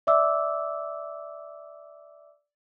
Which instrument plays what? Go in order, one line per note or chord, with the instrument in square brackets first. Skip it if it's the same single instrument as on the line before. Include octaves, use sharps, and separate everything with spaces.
[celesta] D5 E5 D6 E6